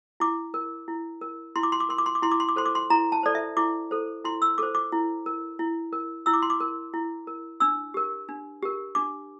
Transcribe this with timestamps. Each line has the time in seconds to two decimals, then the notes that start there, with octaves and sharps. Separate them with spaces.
0.20 E4 D6
0.54 A#4
0.88 E4
1.21 A#4
1.55 E4 C6
1.63 D6
1.72 C6
1.80 D6
1.89 A#4 C6
1.98 D6
2.06 C6
2.15 D6
2.22 E4 C6
2.31 D6
2.40 C6
2.49 D6
2.56 A4 C5 C6
2.66 D6
2.75 C6
2.90 E4 A#5
3.12 A5
3.23 A4 C5 D5
3.35 E5
3.57 E4 D6
3.91 A4 C5
4.25 E4 C6
4.42 E6
4.58 A4 C5 D6
4.75 D6
4.92 E4
5.26 A#4
5.59 E4
5.93 A#4
6.26 E4 E6
6.34 D6
6.42 C6
6.50 D6
6.60 A#4
6.94 E4
7.27 A#4
7.60 D4 E6
7.94 G4 A#4
8.29 D4
8.62 G4 A#4
8.95 D4 D6